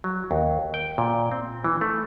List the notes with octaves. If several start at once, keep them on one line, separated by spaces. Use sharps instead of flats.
F#3
D#2
G5
A#2
C4
E3
A3